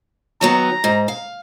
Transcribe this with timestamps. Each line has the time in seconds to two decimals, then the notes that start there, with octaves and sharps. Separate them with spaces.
0.41 D#3 F#3 B3 A#5
0.84 G#2
1.08 F5